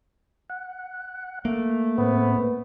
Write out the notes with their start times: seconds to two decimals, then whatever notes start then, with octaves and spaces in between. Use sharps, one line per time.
0.50 F#5
1.45 A3 A#3
1.98 A2 B3 C4